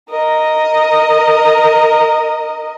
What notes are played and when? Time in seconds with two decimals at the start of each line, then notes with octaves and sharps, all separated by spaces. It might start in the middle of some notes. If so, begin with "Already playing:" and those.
0.10 A#4 D#5